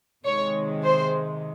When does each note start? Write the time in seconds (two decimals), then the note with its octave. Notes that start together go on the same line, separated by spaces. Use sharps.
0.25 C3 D#3 G#3 C#5
0.84 C5